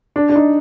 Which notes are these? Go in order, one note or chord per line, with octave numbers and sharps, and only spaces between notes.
D4
D4
D#4